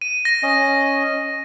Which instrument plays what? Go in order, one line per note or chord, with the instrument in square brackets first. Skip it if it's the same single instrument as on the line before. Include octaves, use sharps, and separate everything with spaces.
[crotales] D#7
A#6
[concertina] C#4 D#5